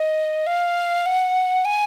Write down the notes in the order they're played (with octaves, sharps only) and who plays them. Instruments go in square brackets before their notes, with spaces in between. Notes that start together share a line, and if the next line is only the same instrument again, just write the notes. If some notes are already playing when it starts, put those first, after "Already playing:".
Already playing: [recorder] D#5
F5
F#5
G#5